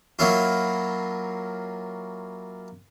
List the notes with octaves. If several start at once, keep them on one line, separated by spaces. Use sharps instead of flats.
F#3 A#3 C#4 E4 F4